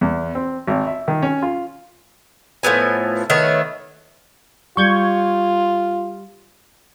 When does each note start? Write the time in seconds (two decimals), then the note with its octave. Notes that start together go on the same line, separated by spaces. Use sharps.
0.01 E2
0.35 C4
0.67 G#1
0.87 E5
1.08 D#3
1.22 C#4
1.42 F4
2.63 A2 F3 B3 G#5
3.30 D#3 A3 B3 C#5
4.77 G3 F4 C#6 G6 G#6